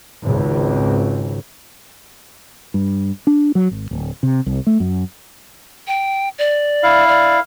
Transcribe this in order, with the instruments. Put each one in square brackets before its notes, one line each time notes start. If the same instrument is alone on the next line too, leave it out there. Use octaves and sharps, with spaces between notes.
[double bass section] G#1 C#2
[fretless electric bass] G2
D4
F#3
G#1
D1
C3
C2
A3
F#2
[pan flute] G5
D5
[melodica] E4 F5
[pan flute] D5